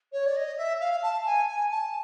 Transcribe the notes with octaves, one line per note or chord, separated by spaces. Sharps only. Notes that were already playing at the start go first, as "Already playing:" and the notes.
C#5
D5
D#5
E5
F5
A5
G#5
G#5
A5